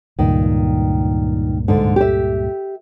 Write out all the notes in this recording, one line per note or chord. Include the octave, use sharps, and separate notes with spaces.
C#2 G2 A#2 D#3
G#2 D3
G4 E5